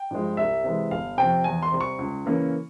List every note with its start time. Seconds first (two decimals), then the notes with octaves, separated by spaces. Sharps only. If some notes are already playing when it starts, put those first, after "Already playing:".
Already playing: G5
0.11 G2 F3 G#3
0.37 C2 E5
0.64 C3 E3 G#3
0.91 G1 F5
1.18 F2 C3 G5
1.44 E2 G#5
1.63 C6
1.72 C3 G3
1.81 C#6
1.99 C#2
2.25 C#3 E3 A#3 C#4